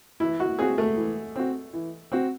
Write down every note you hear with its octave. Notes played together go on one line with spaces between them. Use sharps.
E3 E4
F#4
C4 F#4 G#4
A3
E3
C4 F#4
E3
C4 F#4